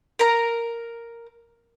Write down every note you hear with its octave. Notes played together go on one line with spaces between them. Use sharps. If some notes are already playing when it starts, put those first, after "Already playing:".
A#4 A#5